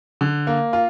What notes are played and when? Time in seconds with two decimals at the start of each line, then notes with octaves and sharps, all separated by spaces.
0.21 D3
0.47 A#3
0.73 F4